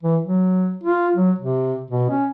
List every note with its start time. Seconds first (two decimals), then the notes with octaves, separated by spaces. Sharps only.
0.03 E3
0.25 F#3
0.83 F4
1.16 F#3
1.39 C3
1.91 B2
2.10 C#4